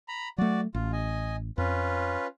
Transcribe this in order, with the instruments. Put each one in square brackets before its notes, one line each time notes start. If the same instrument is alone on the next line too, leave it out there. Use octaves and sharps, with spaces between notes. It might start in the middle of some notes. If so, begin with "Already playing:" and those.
[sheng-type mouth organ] A#5 B5
[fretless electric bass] F#3 A3 [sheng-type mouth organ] F#4 D5
[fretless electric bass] A1 [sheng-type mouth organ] F4
[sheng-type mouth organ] D#5 G#5
[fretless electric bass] F2 [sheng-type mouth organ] C#4 F4 B4